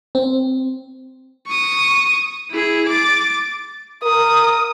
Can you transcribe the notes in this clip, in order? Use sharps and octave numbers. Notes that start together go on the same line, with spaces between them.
C4
C#6 D#6
E4 G#4
D6 A6
A#4 D#6